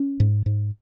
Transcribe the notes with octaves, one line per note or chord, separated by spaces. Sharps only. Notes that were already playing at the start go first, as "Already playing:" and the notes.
Already playing: C#4
G#2
G#2